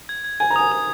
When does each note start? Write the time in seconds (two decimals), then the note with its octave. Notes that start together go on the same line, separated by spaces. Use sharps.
0.09 G#6
0.24 G#6
0.40 G#5 G#6
0.50 A#5
0.56 G#5 D#6
0.72 D#6